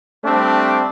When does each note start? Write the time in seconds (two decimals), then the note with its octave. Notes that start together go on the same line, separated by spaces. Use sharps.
0.24 G3 A3 C4 D4